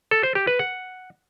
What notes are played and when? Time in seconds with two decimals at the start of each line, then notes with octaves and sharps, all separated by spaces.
0.11 A4
0.23 C5
0.35 G4
0.47 B4
0.59 F#5